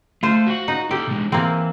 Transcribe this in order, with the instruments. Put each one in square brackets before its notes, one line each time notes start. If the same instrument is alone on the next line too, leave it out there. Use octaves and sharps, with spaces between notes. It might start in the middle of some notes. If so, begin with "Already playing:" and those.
[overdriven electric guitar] A3 [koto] F4 C5
[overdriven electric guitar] F#4 F#5
[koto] D#4
[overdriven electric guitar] D#2 A4 [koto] G4
[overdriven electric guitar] B2 G#3
[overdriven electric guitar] E3 [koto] A#3 C4